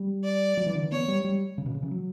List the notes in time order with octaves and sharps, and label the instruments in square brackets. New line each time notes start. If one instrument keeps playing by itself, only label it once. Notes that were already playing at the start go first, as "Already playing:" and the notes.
Already playing: [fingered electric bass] G3
[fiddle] D5
[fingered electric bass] F#3
E3
D3
E3
[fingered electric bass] B3 [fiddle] C#5
[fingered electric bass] G3
G3
C#3
B2
C#3
E3
F#3